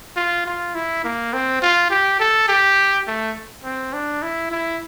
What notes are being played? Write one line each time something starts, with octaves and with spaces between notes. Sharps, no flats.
F4
F4
E4
A#3
C4
F4
G4
A4
G4
A3
C4
D4
E4
E4